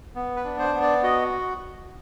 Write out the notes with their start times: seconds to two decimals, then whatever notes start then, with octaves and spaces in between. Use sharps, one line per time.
0.15 B3
0.36 B4
0.44 D4
0.59 C5
0.74 B3
0.82 D5
1.03 F#4 D#5